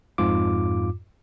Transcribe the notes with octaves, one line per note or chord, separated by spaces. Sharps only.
F2 G#2 F4 D6